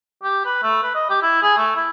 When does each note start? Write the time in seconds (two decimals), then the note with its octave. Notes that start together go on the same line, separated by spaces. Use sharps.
0.24 G4
0.46 B4
0.63 A3
0.83 B4
0.95 D#5
1.10 G4
1.23 E4
1.42 G#4
1.57 A3
1.76 E4